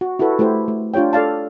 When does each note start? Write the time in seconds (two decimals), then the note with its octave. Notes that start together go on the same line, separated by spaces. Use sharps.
0.01 F#4
0.19 E4 F#4 G4 A4 B4
0.39 A3 E4 G4 C5
0.68 A3
0.94 D4 F4 G4 C#5 G5
1.13 A4 D5 F5 A5